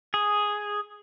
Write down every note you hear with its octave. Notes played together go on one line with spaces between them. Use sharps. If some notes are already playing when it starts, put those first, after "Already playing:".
G#4